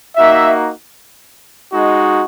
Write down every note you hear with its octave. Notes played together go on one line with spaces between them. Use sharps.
A#3 D#4 F#4 E5
G#3 D#4 F#4